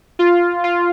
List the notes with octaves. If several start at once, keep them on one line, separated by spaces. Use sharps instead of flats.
F4
F4